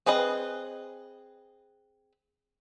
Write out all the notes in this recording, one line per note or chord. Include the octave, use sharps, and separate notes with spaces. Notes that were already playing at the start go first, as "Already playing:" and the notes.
C4 G#4 B4 D#5